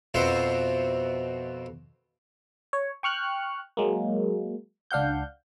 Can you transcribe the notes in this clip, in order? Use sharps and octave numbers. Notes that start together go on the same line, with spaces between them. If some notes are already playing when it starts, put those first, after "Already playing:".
F2 B2 C4 C5 E5
C#5
G5 C#6 F6 F#6
F#3 G#3 A#3
C#2 D4 F5 F#5 G6